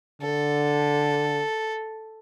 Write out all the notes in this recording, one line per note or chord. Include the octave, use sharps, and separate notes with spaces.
D3 A4